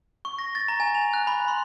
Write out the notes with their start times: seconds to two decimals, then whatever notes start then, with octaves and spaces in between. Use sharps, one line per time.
0.25 C#6
0.39 A#6
0.55 A6
0.68 A#5
0.80 G#5
0.95 F7
1.13 F#6
1.27 B5
1.48 C6